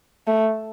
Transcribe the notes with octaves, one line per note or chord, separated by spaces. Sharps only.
A3